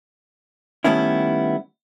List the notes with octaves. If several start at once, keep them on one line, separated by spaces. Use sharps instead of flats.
D#3 G3 A3 B3 C#4 E4